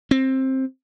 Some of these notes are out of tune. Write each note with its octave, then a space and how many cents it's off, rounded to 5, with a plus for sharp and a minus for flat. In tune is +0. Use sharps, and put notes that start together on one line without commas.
C4 +15